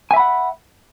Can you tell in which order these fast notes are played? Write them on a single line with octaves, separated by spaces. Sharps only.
G#5 E5 B5 F#5